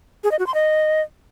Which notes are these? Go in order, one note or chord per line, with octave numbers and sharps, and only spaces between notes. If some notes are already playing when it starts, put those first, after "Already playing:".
G#4
D#5
F#4
C6
D#5